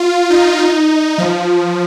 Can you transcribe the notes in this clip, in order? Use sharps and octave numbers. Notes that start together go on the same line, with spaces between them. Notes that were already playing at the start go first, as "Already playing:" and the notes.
Already playing: F4
D#4
D#4
F3